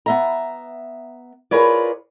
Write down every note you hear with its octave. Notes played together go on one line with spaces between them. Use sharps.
B3 E5 A#5
F4 G#4 A#4 B4 C#5 D5